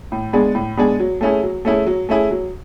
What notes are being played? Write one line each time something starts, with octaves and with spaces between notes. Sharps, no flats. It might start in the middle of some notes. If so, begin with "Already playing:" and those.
A2
G#3 B3 D4 G#4
A2
G#3 B3 D4 G#4
F#3
A3 C#4 E4 G#4
F#3
A3 C#4 E4 G#4
F#3
A3 C#4 E4 G#4
F#3